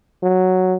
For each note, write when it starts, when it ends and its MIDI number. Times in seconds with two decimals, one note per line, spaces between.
0.23 0.77 54